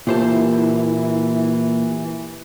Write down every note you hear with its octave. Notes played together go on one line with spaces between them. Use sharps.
A#2 E3 E4 F4 G4 A#4 C5 A5